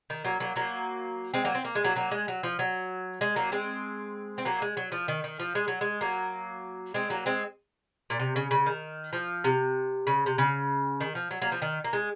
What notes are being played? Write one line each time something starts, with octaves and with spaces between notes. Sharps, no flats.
D#3
F#3 A#3
F#3 A#3
F#3 A#3
G#3 C4
F#3 A#3
C4
A#3
G#3
F#3 A#3
F#3 A#3
G#3
F#3
F3
F#3
G#3
F#3 A#3
G#3 C4
C4
F#3 A#3
G#3
F#3
F3
D#3
D#3
F3
G#3
F#3
G#3
F#3 A#3
G#3 C4
F#3 A#3
G#3 C4
A#2
C3
C#3
C#3
D#3
F3
C3
C#3
C3
C#3
D#3
F3
F#3
F#3 A#3
F3
D#3
A#3
G#3